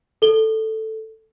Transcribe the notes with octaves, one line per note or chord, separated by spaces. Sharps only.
A4 G7